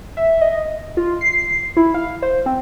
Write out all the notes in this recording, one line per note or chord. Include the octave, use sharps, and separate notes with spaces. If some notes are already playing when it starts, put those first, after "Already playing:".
E5
D#5
F4
C7
E4
F5
C5
C4